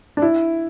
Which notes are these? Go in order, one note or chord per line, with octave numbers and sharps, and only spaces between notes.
D4
E4